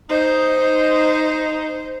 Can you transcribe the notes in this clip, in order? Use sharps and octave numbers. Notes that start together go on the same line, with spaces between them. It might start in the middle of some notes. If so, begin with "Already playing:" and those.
D#4 C5